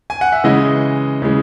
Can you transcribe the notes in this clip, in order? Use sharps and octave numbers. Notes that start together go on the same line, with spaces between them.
G#5
F#5
E5
C#3 E3 G#3 D#5
C#3 E3 G#3